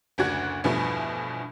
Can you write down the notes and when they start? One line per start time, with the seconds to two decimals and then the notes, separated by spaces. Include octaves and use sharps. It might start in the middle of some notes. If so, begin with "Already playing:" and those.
0.18 F#1 D2 D4 F#4 G#6
0.64 E2 G2 B2 F3 A3 D4